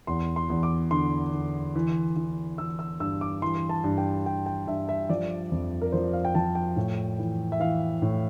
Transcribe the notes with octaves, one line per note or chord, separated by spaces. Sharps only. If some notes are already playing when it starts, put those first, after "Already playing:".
E2 C6
C6
E2
D6
D3 C6
D3
E3
E3
E3 E6
E6
G2 E6
D6
E3 C6
A5
G2
G5
G2 G5
G5
G2 E5
E5
F3 D5
F2
A#4
F3 C5
F5
G5
F3 A5
G5
A2
E3
E5
E3 F5
A2